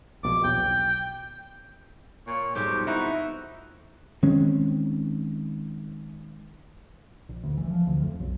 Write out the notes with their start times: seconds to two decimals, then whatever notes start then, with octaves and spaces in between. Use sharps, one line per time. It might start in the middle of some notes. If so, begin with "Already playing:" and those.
0.23 A#1 B2 D6
0.44 B1 E2 G5
2.27 A#2 C#5
2.55 F2 G#2 B2 G3 G4
2.87 D#4 E4 F#4
4.23 D#3 G#3 C4 C#4
7.29 A#1
7.44 D2
7.58 E3
7.71 F3
7.87 D2
8.03 F2
8.20 B1